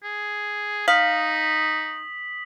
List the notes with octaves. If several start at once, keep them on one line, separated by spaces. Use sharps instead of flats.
G#4
D#4 F5 D#6 B6 F#7